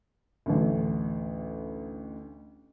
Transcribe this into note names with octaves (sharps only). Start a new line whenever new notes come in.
A1 D2